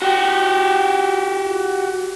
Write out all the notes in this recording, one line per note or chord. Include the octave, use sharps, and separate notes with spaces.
F#4 G4